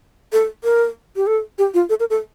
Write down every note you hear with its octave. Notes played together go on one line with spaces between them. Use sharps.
A4
A#4
G4
A4
G4
F4
A4
A#4
A4